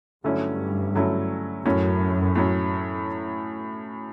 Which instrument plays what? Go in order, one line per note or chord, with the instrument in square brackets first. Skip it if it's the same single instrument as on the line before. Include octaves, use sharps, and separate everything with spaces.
[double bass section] G2 [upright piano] D3 F#3 A3 C#4 E4
[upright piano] D3 F#3 A3 C#4 E4
[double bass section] F#2 [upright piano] A2 F#3 C#4
[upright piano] A2 F#3 C#4